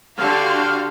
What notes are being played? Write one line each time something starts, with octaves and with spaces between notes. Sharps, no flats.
D3 D4 F#4 G4 A4 F5 C6 F6